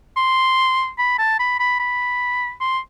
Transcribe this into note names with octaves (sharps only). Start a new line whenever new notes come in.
C6
B5
A5
B5
B5
B5
C6